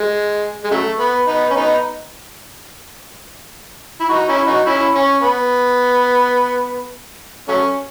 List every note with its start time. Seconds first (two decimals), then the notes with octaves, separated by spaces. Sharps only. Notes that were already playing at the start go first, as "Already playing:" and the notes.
Already playing: G#3
0.64 G#3
0.71 C#3 F#3 A3
0.99 B3
1.27 B3 D#4
1.50 C#4
1.56 B3 D#4
4.00 E4
4.09 D#4 F#4
4.28 C#4 E4
4.47 D#4 F#4
4.66 C#4 E4
4.95 C#4
5.22 B3
7.48 F#3 A3 C#4